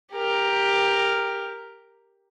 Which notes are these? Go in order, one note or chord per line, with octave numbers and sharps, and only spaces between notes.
G4 A#4